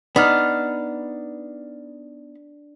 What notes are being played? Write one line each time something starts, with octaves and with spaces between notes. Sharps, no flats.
B3 D4 D#4 F6